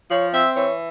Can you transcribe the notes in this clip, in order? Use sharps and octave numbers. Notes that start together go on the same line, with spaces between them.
F3 C#5
C4 E5
E3 C#5